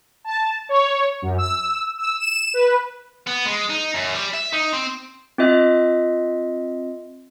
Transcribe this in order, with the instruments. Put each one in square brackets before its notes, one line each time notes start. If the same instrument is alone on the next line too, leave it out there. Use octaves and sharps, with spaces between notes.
[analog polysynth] A5
C#5
F#2
E6
E6
E7
B4
[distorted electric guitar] B3
G#3
D#4
F#2
G3
E5
D#4
C4
[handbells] C4 F4 D#5 E5